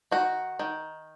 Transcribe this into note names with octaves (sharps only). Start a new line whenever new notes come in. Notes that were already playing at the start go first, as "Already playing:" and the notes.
D#3 F#4
D#3